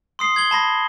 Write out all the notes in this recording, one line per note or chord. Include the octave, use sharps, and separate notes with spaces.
C6 D#6 C7
G#6 F#7 G7
A5 B5 A#6